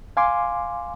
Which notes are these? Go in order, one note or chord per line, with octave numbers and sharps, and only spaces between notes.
F5 G#5 C6 D6